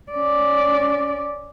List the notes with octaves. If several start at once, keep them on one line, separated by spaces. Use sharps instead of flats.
C#4 D5